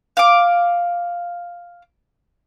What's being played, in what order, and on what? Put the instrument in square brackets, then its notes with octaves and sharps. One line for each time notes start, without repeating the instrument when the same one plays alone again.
[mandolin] F5 D6